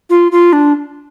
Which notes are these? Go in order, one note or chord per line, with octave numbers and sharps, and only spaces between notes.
F4
F4
D4